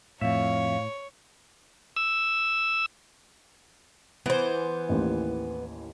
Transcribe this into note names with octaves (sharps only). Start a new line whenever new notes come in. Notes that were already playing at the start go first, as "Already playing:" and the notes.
F2 A2 C#5 E5 F5
E6
E3 B3 C5
A1 D#2